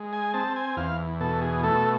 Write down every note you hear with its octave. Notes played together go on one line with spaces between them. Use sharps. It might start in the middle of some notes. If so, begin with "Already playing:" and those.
Already playing: G#3
G#5
C4 A5
G#5
E2 F5
B2 A4
G#4
A3 A4